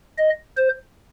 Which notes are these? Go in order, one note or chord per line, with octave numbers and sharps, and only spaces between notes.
D#5
C5